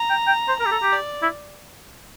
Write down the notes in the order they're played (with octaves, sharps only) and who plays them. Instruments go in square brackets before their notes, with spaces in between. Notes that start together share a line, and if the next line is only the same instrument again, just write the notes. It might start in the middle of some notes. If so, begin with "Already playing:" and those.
Already playing: [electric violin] A#5
[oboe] G5
G5
C5
[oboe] A#4 [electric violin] A#5
[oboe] G4
A4
G4
[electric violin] D5
[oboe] E4